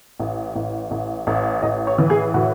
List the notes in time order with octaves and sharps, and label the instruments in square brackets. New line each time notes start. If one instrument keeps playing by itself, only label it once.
[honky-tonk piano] A1
A1
A1
A1
A1 D#5
C#5
E3
G#4
A2 F#4